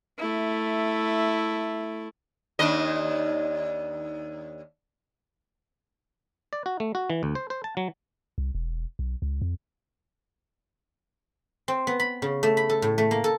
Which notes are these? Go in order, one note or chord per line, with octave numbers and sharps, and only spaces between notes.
A3 E4
D#2 D4 D#5
D5
F#4
A3
F#4
E3
D2
C5
C5
A5
F#3
C2
E1
B1
C#2
F2
C4
B3
B5
C#3
A3
B5
A4
A2
A3
A#3
A4